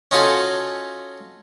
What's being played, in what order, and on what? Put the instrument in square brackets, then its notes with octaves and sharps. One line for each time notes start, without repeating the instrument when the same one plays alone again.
[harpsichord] C#4 D#4 F4 F#4 A4 G#5